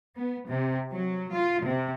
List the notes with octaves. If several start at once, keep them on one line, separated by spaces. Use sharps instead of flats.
B3
C3
F#3
F4
C3